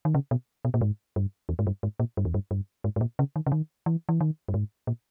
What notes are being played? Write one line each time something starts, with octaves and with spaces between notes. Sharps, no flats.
D#3
C#3
B2
B2
A#2
G#2
G2
E2
G#2
G2
G#2
A#2
G2
E2
G2
G2
G#2
G#2
A#2
C#3
D#3
C#3
D#3
E3
E3
D#3
G2
G#2
A#2